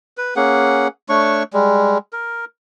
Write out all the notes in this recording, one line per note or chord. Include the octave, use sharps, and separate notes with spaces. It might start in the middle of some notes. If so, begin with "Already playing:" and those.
B4
A#3 C#4 G#4 F#5
A3 D4 C#5 C#6
G3 G#3
A#4